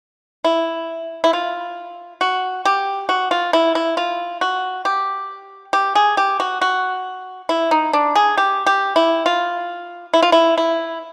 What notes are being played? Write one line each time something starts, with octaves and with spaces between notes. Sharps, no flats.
E4
E4
F4
F#4
G4
F#4
F4
E4
E4
F4
F#4
G4
G4
G#4
G4
F#4
F#4
E4
D#4
D4
G#4
G4
G4
E4
F4
E4
F4
E4
E4